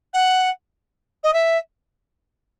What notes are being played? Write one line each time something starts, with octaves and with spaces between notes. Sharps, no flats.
F#5
D#5
E5